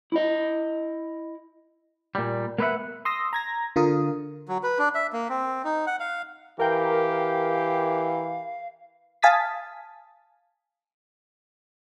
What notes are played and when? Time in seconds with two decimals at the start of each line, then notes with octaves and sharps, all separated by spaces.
0.12 E4 D#5
2.15 A#2 G3
2.58 A#3 B3 B4 D5 E5 F#5
3.05 C6 D#6 E6 A#6
3.33 A#5 G#6 A#6
3.76 D3 F4 A#4 D#6
4.48 F#3
4.63 B4
4.79 D4
4.95 E5
5.13 A#3
5.30 C4
5.64 D#4
5.87 F#5
6.00 F5
6.59 E3 G4 A#4 F5 G5
9.22 F5 G#5 A5 D#6 A6 B6